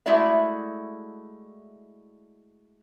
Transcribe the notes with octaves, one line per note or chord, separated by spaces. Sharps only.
G#3 A3 E4 F#4 D5 E5